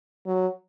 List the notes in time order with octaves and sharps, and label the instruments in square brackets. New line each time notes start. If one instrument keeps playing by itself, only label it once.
[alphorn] F#3